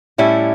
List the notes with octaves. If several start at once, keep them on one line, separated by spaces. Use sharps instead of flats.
A2 G3 C#4 E4